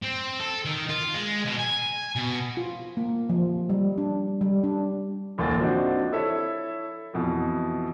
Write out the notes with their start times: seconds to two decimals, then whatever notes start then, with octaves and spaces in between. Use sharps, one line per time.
0.02 C4
0.40 A4
0.65 D#3
0.89 F4
1.14 G#3
1.46 B2
1.59 G#5
2.16 B2
2.57 F4
2.97 A#3
3.29 F3
3.70 G3
3.98 D4
4.41 G3
4.63 D4
5.38 A1 D2 A2 A#3 A6
5.60 F3 C4 D4 D#4 F#4
6.12 E4 A4 C#5 E5
7.14 F2 B2 E3